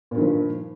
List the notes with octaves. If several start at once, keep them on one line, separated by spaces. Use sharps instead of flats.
G2 A#2 D#3 F3